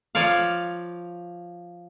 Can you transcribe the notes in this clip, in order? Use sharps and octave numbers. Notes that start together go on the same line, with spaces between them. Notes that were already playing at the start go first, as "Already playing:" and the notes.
F3 C#5 D5 F5